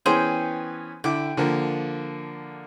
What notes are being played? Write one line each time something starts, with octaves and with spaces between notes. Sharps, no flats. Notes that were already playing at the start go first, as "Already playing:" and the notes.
E3 B3 C#4 G#4 C5 G5
D3 E4 G5 D6
D3 F3 A#3